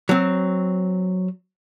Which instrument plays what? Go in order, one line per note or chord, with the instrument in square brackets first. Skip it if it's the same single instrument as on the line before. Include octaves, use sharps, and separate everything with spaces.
[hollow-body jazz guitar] F#3 C4